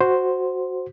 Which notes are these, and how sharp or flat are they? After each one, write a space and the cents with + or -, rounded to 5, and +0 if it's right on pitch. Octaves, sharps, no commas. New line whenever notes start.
F#4 +0 C5 +0